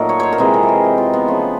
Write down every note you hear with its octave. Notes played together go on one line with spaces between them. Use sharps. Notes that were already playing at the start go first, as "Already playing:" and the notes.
Already playing: A#2 F#3 A3 D#4 A#4
C#5
C5 C#5
A#4
C3 E3 G#3 B4
A#4
A4
G#4
G4
F4
B3
C#3 F3 A3